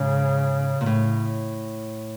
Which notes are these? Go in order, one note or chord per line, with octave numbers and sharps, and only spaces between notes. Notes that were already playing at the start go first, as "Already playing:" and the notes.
Already playing: G#2 C#3
A#2
A2